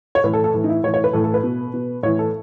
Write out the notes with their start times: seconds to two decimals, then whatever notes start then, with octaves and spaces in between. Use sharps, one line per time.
0.15 C#5
0.24 A2 E3 B4
0.33 A4
0.44 A4
0.54 A2 E3
0.64 D#4
0.69 E4
0.83 A2 E3 C#5
0.94 C#5
1.04 B4
1.13 A2 E3 A4
1.24 A4
1.34 B4
1.43 B2
1.74 B2
2.03 A2 E3 C#5
2.19 A4